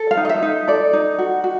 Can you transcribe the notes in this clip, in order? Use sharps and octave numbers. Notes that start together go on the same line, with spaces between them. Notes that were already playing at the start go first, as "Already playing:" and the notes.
Already playing: A4
F5
D#4
D#5
E5
D#4
A4 D5
D#4
F#4
F#4